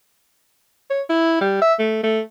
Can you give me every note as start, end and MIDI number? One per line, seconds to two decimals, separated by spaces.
0.90 1.02 73
1.09 1.39 64
1.41 1.57 55
1.62 1.74 76
1.79 2.01 57
2.03 2.20 57